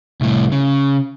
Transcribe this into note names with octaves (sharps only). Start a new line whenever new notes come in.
C2 A2
C#3